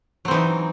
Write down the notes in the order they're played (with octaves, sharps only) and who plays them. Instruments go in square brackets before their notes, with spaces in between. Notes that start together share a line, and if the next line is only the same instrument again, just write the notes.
[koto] F#3
C4
E3
D#4